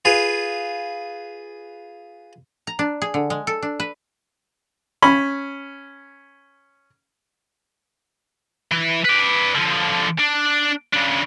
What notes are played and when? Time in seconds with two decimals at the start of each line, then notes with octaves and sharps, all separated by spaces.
0.05 F4 G#4 B4 F5
2.67 A#5
2.79 D4
3.02 G#4
3.14 D3
3.30 G#3
3.47 A4
3.62 D4
3.80 B4
5.02 C#4 B5
8.72 E3
9.05 B4 D5
9.55 D3 F3
10.19 D4
10.93 C#3 D4